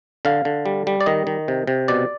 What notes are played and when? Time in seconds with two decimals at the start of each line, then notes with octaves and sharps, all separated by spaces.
0.25 D3 F5
0.45 D3
0.66 G3
0.87 G3
1.01 D5
1.06 D#3 D#5
1.27 D#3
1.48 C3
1.67 C3
1.88 B2 D5